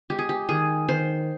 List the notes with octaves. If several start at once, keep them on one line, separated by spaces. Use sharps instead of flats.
G#3 G4
G#4
G4
D#3 G#4
D#3 C5